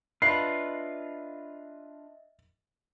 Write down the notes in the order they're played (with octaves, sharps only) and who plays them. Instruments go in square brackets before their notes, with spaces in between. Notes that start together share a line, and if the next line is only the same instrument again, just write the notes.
[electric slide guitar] D4 F4 B4 [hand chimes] D#5 E5 [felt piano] C7